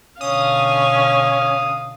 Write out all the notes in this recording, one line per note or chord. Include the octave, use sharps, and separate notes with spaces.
B2 D3 C#4 F5 D#6